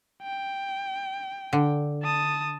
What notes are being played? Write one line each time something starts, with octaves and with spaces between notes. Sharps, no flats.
G5
D3
A5 D#6